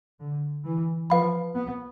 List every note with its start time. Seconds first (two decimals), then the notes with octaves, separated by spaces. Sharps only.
0.20 D3
0.65 E3
1.10 F3 B4 F5 B5
1.55 B3